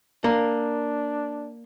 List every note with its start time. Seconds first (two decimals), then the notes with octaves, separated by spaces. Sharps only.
0.24 A#3 D4